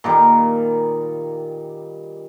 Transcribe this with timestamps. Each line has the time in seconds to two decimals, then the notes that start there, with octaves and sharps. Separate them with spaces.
0.04 A#2 D#3 G3